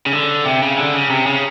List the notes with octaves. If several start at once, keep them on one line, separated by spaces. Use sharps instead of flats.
C#3
D3
C3
C#3
D3
C#3
C3
C#3